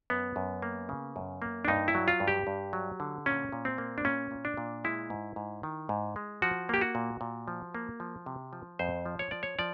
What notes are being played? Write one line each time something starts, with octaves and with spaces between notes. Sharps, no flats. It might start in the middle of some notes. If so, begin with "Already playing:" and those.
F#2 B3
F#2
A#3
C#3
F#2
A#3
D4
G2 D#4
E4
F#3
F4
G2
G4
G2
F#3
D3
A#2 C#4
A#2
C4
A#3
D4
A#2 C#4
A#2
D4
A#2
G#3 E4
G#2
G#2
D#3
G#2
G#3
F3 F#4
A#3 G4
F#4
A#2
A#2
F3
A#3
F3
C3
F3
F2 C5
F3
C#5
F3 D5
C#5
F3 D5